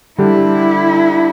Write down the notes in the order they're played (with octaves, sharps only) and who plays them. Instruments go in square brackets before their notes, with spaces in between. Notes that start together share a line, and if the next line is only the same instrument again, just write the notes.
[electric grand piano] D3 G3 D4 G4 [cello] E4